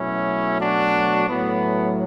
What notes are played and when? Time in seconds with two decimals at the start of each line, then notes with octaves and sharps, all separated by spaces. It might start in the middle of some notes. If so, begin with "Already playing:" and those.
Already playing: B2 F#3 A3 C#4 E4
0.60 D4 F#4
1.28 A2 F#3 A3 B3